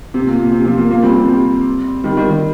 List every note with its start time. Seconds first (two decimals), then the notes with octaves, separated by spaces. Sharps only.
0.14 C3
0.27 A#2
0.39 A#2
0.52 C3
0.65 C3 F3
0.77 F3 A#3
0.90 F3 A#3
1.02 G3 C4
1.15 G3 C4
1.28 G3 C4
2.04 D#3 G3
2.17 D#3 G3
2.30 D#3 G3